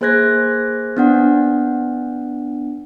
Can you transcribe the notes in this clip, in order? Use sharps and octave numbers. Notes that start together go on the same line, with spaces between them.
A#3 G#4 C5 F#6 G#6 A#6
B3 D4 F#5